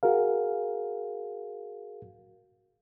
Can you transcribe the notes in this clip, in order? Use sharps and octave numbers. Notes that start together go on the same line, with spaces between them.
F#4 G#4 A#4 F5